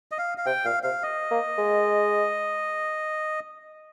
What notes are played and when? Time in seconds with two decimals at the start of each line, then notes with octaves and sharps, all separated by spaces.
0.11 D#5
0.18 F5
0.38 F5
0.46 C3 G5
0.65 A#2 F5
0.83 C3 F5
1.03 D#5
1.31 A#3
1.58 G#3